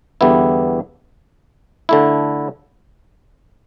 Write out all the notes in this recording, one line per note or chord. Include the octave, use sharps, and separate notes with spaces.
E2 D3 G3 B3 E4
D3 A3 E4